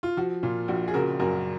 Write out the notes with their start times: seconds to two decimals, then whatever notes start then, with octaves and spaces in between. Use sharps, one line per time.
0.03 F4
0.17 F3 F#4
0.43 A#2 F4
0.68 A#1 F#4
0.88 G#4
0.94 C#3 F#4 A#4
1.20 F#2 F#4 A#4